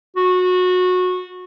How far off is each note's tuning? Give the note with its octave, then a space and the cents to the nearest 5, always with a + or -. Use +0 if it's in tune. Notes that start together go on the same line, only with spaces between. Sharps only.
F#4 -20